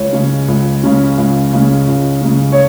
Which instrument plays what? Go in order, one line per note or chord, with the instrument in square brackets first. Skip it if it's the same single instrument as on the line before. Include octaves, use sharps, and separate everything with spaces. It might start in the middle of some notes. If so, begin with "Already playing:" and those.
Already playing: [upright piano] C#2 C#5
C#3 G#3 C#4
C#2
C#3 G#3 C#4
C#2
C#3 G#3 C#4
C#2
C#3 G#3 C#4
C#5